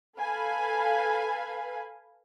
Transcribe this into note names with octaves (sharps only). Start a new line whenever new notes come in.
A4 B4 F5 G#5 B5